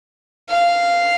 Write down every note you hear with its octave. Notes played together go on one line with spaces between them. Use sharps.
F5